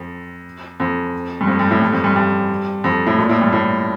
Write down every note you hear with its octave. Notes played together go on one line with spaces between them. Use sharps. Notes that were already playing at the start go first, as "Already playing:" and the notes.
Already playing: F2
F2
G2
F2
G2
A2
G2
F2
G2
G2
F2
A2
A#2
A2
G2
A2